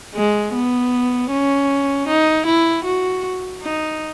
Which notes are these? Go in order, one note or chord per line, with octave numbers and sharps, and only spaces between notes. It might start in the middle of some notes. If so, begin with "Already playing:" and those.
G#3
B3
C#4
D#4
E4
F#4
D#4